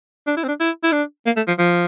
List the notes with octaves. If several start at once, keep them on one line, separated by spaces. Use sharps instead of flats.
D4
E4
C4
D4
E4
E4
D4
A#3
A3
F3
F3